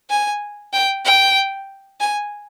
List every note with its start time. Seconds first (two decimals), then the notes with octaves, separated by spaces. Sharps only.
0.10 G#5
0.73 G5
1.05 G5
2.00 G#5